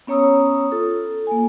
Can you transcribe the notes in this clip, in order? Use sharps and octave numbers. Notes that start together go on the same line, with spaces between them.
B3 C#4 C#5 A#5 D#6 E6
F4 A4
A#3 G#5